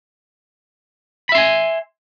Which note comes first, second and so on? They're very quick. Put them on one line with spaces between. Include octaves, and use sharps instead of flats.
B5 E5 C6 G#5